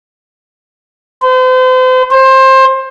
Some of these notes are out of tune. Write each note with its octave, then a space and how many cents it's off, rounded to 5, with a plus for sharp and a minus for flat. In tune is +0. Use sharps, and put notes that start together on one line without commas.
C5 -40
C5 +20